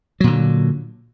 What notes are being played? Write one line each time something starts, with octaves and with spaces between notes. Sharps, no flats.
A#2 D3 F#3